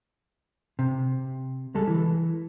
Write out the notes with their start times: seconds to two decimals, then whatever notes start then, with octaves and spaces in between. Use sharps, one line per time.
0.79 C3
1.74 C#2 G3 G#3 A4
1.87 E3